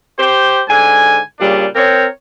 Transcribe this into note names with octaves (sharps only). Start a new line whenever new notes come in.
G4 C5
G#2 D3 G#5
A#2 C#3 G3 D4
C4 A#4 C#5 G5